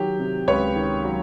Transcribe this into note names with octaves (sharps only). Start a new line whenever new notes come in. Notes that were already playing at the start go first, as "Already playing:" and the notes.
Already playing: D#3 F#3 G4
C3
C#2 B4 C#5
D#3
F#3